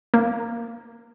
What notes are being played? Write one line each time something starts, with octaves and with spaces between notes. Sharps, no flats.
A#3